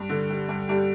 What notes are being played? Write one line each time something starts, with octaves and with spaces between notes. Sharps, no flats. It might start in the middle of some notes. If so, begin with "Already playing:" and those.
Already playing: G2
D3
G3
G2
G2 G3 G4